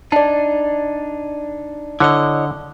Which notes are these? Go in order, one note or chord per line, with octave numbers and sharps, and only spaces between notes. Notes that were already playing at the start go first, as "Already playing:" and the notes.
D4 D#4 D5 A5
D3 E4 C#5 D#5